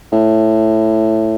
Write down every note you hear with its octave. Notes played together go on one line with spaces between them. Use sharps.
A2